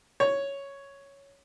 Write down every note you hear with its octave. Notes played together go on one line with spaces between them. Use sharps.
C#5